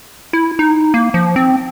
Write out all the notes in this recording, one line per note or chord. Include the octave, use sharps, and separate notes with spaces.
E4
D#4
A#3
F3
C4